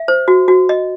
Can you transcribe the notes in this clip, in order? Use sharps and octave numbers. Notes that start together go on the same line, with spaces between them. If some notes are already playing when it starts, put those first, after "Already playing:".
Already playing: E5
C5
F#4
F#4
D#5